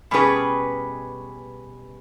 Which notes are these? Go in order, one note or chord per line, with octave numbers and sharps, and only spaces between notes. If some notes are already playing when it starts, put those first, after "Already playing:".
B2 G3 C#4 G#4 B4